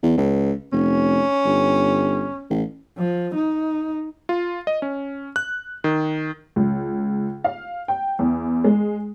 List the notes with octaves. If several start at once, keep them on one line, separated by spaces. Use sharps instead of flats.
E2
C#2
F1 C#4
G1
A1
F3
D#4
F4
D#5
C#4
F#6
D#3
C#2
F5
G5
E2
G#3